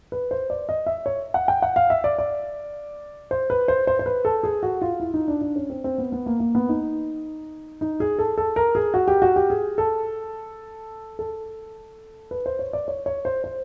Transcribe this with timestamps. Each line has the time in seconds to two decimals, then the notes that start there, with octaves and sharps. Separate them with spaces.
0.12 B4
0.31 C5
0.50 D5
0.69 D#5
0.86 E5
1.06 C#5
1.34 F#5
1.48 G5
1.62 F#5
1.76 F5
1.90 E5
2.04 D5
2.18 D5
3.31 C5
3.50 B4
3.68 C5
3.87 C5
3.99 C5
4.06 B4
4.25 A4
4.43 G#4
4.63 F#4
4.82 F4
5.00 E4
5.14 D#4
5.28 D4
5.41 D4
5.56 C#4
5.70 C4
5.84 C4
5.98 B3
6.12 B3
6.26 A#3
6.40 A#3
6.55 B3
6.69 D#4
7.81 D#4
8.00 G#4
8.19 A4
8.38 A4
8.56 A#4
8.75 G#4
8.94 F#4
9.08 G4
9.22 F#4
9.36 G4
9.50 G#4
9.78 A4
11.19 A4
12.31 B4
12.46 C5
12.59 C#5
12.73 D5
12.88 C#5
13.06 C#5
13.25 C5
13.44 C5